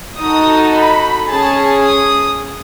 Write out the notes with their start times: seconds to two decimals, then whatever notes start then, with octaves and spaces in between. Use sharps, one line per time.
0.20 D#4 F#4 A4 D#6
0.75 B5
1.31 C#4 G#4 A5
1.86 D#6